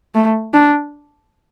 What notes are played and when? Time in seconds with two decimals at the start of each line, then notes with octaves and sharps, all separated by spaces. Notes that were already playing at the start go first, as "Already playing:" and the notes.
0.15 A3
0.54 D4